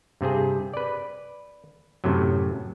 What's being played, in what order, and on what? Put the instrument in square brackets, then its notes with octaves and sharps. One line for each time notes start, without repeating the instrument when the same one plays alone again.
[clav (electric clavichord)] G2 C3 C4 G#4
B4 D5
F#2 A2 C3 F#3